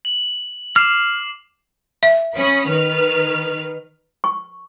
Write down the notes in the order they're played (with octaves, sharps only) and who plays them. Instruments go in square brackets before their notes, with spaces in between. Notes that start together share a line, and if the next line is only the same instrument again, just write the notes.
[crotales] F#7
[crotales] D6 C7 E7 [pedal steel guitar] F6
[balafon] E5
[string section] C#4 B5 D#6
D#3 B4 F6
[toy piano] C#6